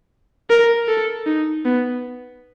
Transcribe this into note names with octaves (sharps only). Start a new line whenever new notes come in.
A#4
A4
D#4
B3